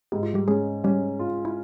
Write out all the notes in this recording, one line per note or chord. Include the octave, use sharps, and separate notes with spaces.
G#2 G4
F4
G3 G4
G#3 C#4 G#4
G3 C#4 G4
F4
E4